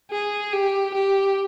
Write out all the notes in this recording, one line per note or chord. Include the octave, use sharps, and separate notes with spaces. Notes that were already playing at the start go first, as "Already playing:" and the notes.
G#4
G4
G4